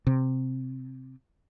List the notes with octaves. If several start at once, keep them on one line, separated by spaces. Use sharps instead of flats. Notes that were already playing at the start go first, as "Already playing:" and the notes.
C3